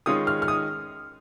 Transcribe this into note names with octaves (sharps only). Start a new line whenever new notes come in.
D#3 G#3 C#4 F4 D#6
F6
F6
D#6